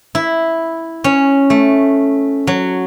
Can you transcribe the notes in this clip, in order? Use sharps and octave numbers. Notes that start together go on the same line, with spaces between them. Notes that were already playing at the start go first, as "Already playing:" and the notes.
E4
C#4
A3
F#3